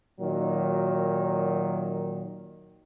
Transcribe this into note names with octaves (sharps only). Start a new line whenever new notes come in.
A#2 D#3 F#3